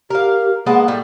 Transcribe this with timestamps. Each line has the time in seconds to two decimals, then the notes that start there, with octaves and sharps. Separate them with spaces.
0.10 G4 A#4 F5
0.66 G#3 A#3 B3 A5
0.88 A2 G3